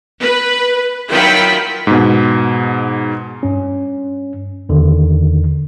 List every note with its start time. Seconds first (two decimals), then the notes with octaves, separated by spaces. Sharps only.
0.20 B4
1.11 D#3 F#3 E4 F4 G5 B5
1.87 G#2 B2
3.43 G2 C#4
4.69 E2 D3 D#3